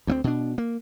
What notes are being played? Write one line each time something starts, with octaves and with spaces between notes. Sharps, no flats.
D2 A3 C4
B2 D4
A#3